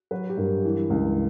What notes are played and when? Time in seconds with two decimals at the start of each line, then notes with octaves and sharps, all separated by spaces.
0.11 F#3 B4
0.30 G4
0.37 G2 A#4
0.65 E3
0.90 C#2